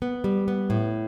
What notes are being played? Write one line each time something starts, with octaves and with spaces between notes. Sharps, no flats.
B3
G3
B3
A2